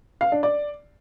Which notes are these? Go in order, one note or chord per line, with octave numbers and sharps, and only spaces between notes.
F5
D4
D5